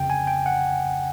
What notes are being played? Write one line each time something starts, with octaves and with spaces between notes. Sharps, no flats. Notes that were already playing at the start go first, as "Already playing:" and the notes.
Already playing: G1 F2 C#3 G5
G#5
G5
F#5